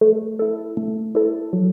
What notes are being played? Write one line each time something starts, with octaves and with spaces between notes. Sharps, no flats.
A3
E4 A4
A3
E4 A4
F#3